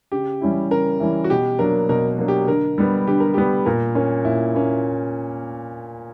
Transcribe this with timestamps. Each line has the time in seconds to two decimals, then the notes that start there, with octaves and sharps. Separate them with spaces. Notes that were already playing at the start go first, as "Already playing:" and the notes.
0.12 C#3 G4
0.41 E3 G3 C#4 E4
0.71 C#3 A#4
1.00 E3 G3 C#4 E4
1.24 F#4
1.30 B2 G4
1.59 F#3 A#3 D4 A#4
1.89 B2 A#4
2.18 F#3 A#3 D4
2.28 G4
2.48 D3 A#4
2.78 G3 B3
3.07 D3 G4
3.20 A#4
3.34 G3 B3 G4
3.66 A#2 A#4
3.95 A#3 C#4
4.25 A#2 E4
4.55 A#3 C#4